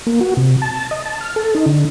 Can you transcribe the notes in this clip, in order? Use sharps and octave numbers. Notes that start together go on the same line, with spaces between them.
A#3
F#4
C3
A5
D#5
A5
F6
A4
D#4
D3